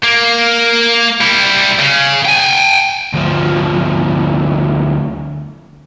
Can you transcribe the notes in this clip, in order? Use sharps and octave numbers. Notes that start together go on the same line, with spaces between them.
A#3
G3 E4
C#3
G5 G#5
D2 F3